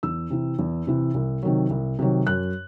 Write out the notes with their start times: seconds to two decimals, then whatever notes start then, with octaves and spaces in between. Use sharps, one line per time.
0.03 E2 E6
0.30 C3 E3
0.59 E2
0.87 C3 E3
1.14 C2
1.43 C3 D#3 F#3
1.70 C2
1.99 C3 D#3 F#3
2.27 F#2 F#6